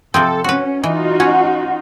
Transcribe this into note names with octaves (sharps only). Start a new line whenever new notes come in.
C3 F3 C4 A4
C#4 F#4 B4
E3 D#4 F4 F#4
C#4 F#5